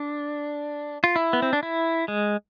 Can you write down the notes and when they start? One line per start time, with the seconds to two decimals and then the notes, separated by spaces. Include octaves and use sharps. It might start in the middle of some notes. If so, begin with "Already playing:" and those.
Already playing: D4
1.04 F4
1.16 E4
1.33 B3
1.42 C4
1.53 D4
1.63 E4
2.08 G#3